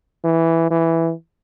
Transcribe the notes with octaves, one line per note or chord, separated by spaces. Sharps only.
E3
E3